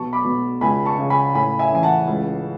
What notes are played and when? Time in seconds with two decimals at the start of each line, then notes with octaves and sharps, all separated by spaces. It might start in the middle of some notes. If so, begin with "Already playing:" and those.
Already playing: B1 B2 A5 C#6
0.13 B5 D6
0.24 B2
0.61 C#2 G#5 B5
0.85 A5 C#6
0.98 C#3
1.10 G#5 B5
1.34 A2 G#5 B5
1.59 E5 G#5
1.71 A1 G#5
1.83 F#5 A5
2.08 C#2